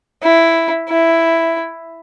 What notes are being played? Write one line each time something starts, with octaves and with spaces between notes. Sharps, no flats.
E4
E4